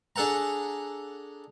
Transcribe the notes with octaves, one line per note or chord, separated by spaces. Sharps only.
D4 G#4 A4 F#5 A#5